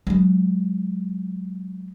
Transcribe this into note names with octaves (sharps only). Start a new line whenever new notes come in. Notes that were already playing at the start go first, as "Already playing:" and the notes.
F#3 G#3